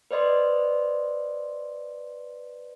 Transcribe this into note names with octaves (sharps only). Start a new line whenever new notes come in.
B4 C5 D5 D#5 C6